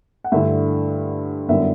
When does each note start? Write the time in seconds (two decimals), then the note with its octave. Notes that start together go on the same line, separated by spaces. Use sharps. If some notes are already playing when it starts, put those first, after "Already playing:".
0.24 F#5
0.32 G2 D3 A3 E4 E5
1.48 F#2 D3 G3 B3 E4 E5